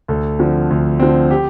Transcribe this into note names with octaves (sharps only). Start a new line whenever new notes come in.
D2 A4
D3 F3 C4
D2
D3 F3 C4
G4